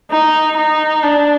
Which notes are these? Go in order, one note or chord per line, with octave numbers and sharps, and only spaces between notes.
D#4
D#4
D4